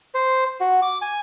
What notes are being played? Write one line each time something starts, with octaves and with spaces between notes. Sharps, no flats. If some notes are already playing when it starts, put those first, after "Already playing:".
C5
F#4
D6
G#5